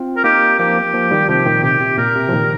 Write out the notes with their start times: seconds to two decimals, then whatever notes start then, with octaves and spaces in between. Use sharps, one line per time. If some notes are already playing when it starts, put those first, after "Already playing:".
Already playing: C4 F4
0.17 A#4
0.24 A#3 D#4 G4
0.59 F3 A#3 G4
0.94 F3 A#3
1.11 D#3 G3
1.28 C3 F3 G4
1.46 A#2 D#3
1.63 C3 G4
1.80 C3
1.98 A#2 A#4
2.16 C3
2.28 F3
2.33 A#2 D#3